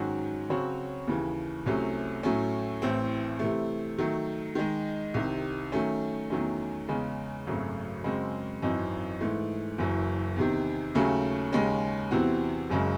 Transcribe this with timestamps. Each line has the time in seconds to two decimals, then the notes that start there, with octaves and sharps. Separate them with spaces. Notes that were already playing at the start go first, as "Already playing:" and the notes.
Already playing: G#2 D#3 F#3 C#4 F#4
0.49 C#3 F#3 C4 F#4 C#5
1.07 D#2 C#3 E3
1.66 C2 C3 F#3 A3 C#4
2.23 A2 F#3 A3 C#4
2.82 A1 A2 E3 C4
3.39 C3 E3 A3
3.98 D#3 F#3 A3
4.55 D#3 G#3 D#4
5.14 C2 C3 D#3
5.72 D#3 F#3 A3 C#4
6.30 E2 D#3 F#3 A3 C#4
6.88 E2 C#3 G#3 C#4
7.47 G#1 F#2 C#3 F#3 A3
8.04 F#2 C#3 G#3 C4
8.62 G#1 F#2 E3 C4 D#4
9.21 G#2 E3 A3
9.78 F#1 F#2 E3
10.36 E2 C3 D#3
10.95 D#2 C#3 F#3 A3 C#4
11.53 D#2 C#3 G#3 C#4
12.11 E2 C3 E3 C4 F#4
12.70 F#1 F#2 C#3 G#3